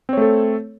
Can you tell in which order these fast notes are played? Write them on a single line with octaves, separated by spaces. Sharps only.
C4 C#5 A3 A4